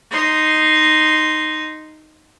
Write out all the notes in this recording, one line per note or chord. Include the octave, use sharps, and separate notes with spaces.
D#4 C6